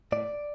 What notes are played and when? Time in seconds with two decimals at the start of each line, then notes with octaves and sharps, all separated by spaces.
0.12 A2 D5